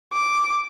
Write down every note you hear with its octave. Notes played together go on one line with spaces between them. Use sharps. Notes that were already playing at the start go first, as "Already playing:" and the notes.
D6